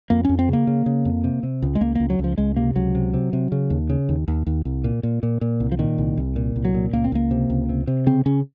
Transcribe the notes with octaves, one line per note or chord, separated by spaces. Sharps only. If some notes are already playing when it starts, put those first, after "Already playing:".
F2 A#3
F2 C#4
C4
C#3 A#3
C#3
C#3
F2
C3
C3
C#2
G#3
C#2 A#3
C#2 A#3
F#3
C#2 F3
C#2 G#3
C3 A#3
C#2 F#3
C3
C3
C3
C#3
D#2
C#3
D#2
D#2
D#2
C2
A#2
A#2
A#2
A#2
C2
F3
A#2 D#3
C2
C2
A#2
C2
F#3
A#2
C#2 A#3
C4
C#2 A#3
C3
C#2
C3
C3
C#3 C4
C#3 C#4